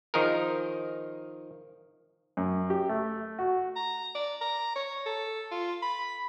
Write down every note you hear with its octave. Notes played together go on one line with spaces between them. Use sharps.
D#3 F3 D#4 G#4 A#4
F#2
G4
A3
F#4
A#5
D5
A#5
C#5
A4
F4
B5